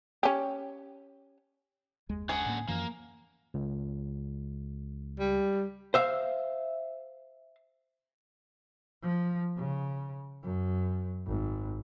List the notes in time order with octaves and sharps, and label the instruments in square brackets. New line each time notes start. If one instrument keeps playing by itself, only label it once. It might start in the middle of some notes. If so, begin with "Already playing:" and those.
[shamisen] C#4 G4
[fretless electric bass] F#1 D#2 G#3
[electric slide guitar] D3 C#4 F#5 [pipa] G#4
[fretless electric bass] A2 A#3
[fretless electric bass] F#2 E3 F3 [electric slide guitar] A#3
[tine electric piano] C#2
[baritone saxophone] G3
[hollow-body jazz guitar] C5 E5 F5
[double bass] F3
C#3
F#2
G#1